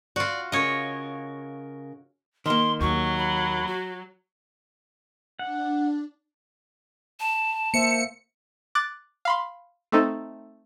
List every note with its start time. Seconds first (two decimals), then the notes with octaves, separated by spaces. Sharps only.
0.16 F4 F#4 D5
0.52 C#3 A#4 C#5 D#5
2.46 D#3 A#3 C6
2.81 D#2 F#3 C#6
3.18 B5
3.67 F#4
5.39 D4 F#5
7.20 A5
7.74 A#3 C5 E5 C#7
8.75 D6 F#6 A6
9.25 F5 B5 C6
9.92 A3 C4 D#4 A4